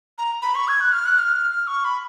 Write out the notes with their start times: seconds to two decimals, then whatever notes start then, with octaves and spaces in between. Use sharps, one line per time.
0.18 A#5
0.42 B5
0.55 C#6
0.68 G#6
0.81 F#6
0.92 F6
1.06 F#6
1.18 F6
1.67 C#6
1.85 B5